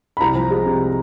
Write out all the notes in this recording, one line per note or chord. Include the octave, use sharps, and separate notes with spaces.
B5
C2 A#5
F3
G#3
C3